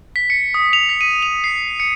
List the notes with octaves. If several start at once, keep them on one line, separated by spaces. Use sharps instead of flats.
B6
C#7
D#6
F7
B6
D#7
F7
C7
C#7